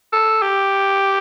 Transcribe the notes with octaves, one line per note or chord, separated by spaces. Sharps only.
A4
G4